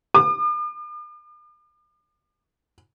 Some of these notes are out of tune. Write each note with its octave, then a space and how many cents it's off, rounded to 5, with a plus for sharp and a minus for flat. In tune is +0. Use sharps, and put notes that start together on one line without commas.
D6 +45